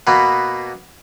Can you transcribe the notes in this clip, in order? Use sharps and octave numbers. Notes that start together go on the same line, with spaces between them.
B2 A#3 B3